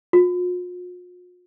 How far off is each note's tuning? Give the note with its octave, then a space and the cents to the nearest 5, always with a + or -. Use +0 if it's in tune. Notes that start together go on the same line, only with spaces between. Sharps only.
F4 +45